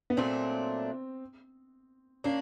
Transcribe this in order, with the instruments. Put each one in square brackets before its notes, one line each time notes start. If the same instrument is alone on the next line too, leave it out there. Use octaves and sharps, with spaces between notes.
[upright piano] B3
[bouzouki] A#2 F#3 A3 D4 [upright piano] C4
[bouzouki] A#3 D4 [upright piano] C#4